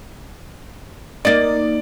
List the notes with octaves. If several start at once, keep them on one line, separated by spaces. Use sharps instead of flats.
A#3 D#4 D5 A6